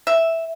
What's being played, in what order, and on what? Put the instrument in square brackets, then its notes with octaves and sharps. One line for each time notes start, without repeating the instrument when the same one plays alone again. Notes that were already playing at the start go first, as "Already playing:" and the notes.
[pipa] E5